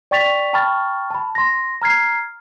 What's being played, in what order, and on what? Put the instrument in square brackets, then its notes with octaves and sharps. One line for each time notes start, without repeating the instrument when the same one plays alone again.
[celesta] D5 G5 C#6 A6 B6 F7
G5 A5 B5 C#6 F6 A6
A5 B5
C6 A#6
A#5 F6 G#6 C7